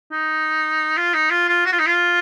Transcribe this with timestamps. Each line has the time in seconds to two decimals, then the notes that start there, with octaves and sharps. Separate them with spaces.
0.12 D#4
0.97 F4
1.14 D#4
1.30 F4
1.48 F4
1.65 F#4
1.72 F4
1.79 D#4
1.87 F4